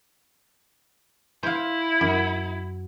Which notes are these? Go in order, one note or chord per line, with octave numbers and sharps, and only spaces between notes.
E4 C5 F5
F#2